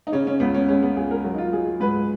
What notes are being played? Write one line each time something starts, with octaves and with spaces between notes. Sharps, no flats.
D#4
C#3 C#4
C#4
C#2 B3
C#4
G#3 C#4
B3
C#2 G#4
A#4
F#3 F#4
D#4
F4
F#3 G#4
G#2 B4